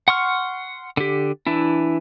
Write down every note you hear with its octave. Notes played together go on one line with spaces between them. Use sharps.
F#5 C6 C#6 F6
D3 G4
E3 D4 E4